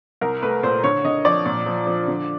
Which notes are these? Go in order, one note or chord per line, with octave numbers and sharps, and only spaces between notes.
C2 A#4
A3 B4
A#2 C5
D3 C#5
D3 D#5
F3 D5
A#2
F3
F3
D3